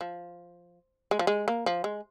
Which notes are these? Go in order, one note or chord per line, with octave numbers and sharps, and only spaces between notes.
F3
G#3
F3
G#3
A#3
F3
G#3